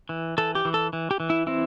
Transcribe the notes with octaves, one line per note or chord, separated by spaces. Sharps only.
E3
E3 A4
G4
E3
A4
E3
G4
E3
E4
C4 E4